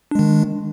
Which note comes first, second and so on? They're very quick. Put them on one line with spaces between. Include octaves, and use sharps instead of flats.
D4 G#3 D#3